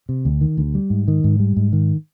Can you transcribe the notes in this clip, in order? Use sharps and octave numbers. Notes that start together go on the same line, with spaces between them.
C3
D2
D#3
D2
G3
G#2
D#3
G#2
G3
G#2
D#3